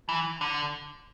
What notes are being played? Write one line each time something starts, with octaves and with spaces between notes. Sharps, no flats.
E3
D3